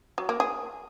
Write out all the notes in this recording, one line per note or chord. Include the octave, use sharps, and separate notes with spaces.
F#3
A#3
G#4